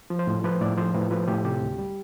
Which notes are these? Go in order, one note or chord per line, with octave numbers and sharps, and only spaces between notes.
F3
C5
A2
F3 B4
A2 D5
F3 C5
A2 B4
F3 B4
A2 G4
C3 G4
D2
G3